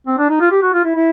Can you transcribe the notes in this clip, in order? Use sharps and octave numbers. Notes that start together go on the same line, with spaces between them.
C4
D4
D#4
F4
G4
F#4
F4
E4
E4